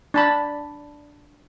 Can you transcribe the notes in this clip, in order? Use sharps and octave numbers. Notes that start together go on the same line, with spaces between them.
D4 A5 B5